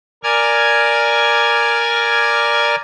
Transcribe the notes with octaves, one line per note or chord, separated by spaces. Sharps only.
A#4 D5 G#5 F6 G#6